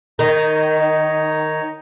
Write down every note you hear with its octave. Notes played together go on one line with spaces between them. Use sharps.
D#3 D#4 C#5 D#5